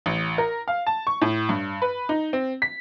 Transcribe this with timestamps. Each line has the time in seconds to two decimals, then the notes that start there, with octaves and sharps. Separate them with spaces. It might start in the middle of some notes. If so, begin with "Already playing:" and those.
0.06 A1
0.38 A#4
0.68 F5
0.87 A5
1.07 C#6
1.22 A2
1.49 G2
1.82 B4
2.09 D#4
2.33 C4
2.62 B6